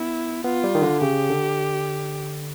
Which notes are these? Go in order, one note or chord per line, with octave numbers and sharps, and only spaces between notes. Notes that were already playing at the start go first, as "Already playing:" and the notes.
Already playing: B3 E4
B3 F4
G3
D#3
D3
C#3 G4
D3